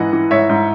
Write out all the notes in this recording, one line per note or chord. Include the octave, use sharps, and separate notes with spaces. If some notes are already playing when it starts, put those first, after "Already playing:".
Already playing: G#2 E3 D#5 F#5
E3
G#2 C#5 E5
G#2